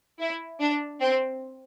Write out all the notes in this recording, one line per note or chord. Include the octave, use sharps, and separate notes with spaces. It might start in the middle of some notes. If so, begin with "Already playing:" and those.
E4
D4
C4